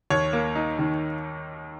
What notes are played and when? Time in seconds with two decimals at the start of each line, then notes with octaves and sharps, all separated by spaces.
0.10 D#2 C#5
0.33 A#3
0.55 D#4
0.79 D#3